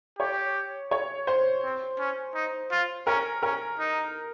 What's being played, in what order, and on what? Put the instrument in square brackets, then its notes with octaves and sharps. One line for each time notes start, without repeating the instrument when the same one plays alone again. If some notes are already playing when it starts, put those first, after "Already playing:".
[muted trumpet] G4 [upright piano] C#5
[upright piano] C#5
C5
[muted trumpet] C4
C#4
D#4
F4
[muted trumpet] C#4 [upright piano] A#4
[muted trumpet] C#4 [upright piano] A#4
[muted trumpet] D#4